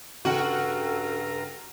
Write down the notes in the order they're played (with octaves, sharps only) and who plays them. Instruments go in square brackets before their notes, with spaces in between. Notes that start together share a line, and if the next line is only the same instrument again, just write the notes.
[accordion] G2 A#5 [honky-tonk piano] C#3 F#5 G5 [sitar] F#4 [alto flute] A4